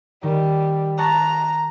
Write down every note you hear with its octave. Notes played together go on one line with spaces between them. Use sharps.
D#3 G3
A5 A#5 C#6 F#6